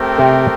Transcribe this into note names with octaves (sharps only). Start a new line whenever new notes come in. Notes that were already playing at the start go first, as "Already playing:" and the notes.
Already playing: A3 C4 G4 A#4
C3